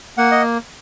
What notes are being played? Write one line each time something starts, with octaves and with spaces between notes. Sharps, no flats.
A#3 F#5
D#5